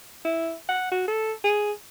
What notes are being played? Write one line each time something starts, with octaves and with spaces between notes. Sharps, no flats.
E4
F#5
F#4
A4
G#4